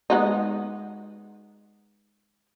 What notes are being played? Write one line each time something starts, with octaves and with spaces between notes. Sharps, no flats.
G#3 B3 D#4